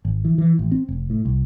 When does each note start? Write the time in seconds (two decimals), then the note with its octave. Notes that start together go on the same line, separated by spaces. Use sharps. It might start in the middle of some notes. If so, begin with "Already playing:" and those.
0.05 G#1
0.25 E3
0.38 E3
0.59 A1
0.72 C4
0.88 F1
1.10 A2
1.25 C2